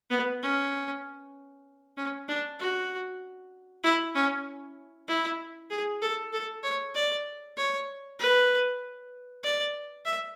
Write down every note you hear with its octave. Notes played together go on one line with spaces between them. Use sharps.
B3
C#4
C#4
D4
F#4
E4
C#4
E4
G#4
A4
A4
C#5
D5
C#5
B4
D5
E5